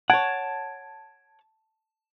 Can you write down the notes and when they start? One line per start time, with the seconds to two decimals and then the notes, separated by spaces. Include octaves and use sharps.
0.10 C#5 F#5 A5 G#6 D7